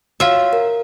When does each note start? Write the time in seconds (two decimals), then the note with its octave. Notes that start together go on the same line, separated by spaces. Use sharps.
0.20 F4 F#4 C#5 E5 F5
0.53 A#4